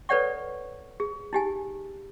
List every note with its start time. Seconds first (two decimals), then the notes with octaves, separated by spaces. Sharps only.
0.09 A4 B4 C#5 D5 F#5 C#6
1.00 G#4
1.33 D#4 G4 G#5